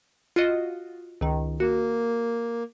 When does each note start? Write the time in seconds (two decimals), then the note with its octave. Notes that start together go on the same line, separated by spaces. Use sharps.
0.36 F4 F#4 D#5
1.21 C#2 D#3
1.60 A#3 F#4